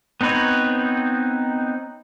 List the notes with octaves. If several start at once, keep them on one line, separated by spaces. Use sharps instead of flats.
B3 C4 D#4 B4 C#5